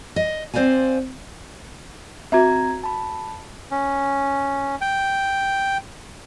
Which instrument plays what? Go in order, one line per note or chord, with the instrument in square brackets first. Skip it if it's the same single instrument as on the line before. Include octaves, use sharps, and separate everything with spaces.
[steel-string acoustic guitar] D#5
C4 C5 D5 F5 G#5
[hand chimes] C4 A#5 G#6 [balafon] F#4 E5
[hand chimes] A5 B5
[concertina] C#4
G5